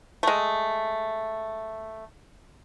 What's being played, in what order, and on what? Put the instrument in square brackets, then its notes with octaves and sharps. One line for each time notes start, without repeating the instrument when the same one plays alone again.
[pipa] G#3 A3